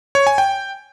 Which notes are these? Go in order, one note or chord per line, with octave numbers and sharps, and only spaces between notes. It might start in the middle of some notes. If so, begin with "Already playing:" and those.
C#5
G#5
G5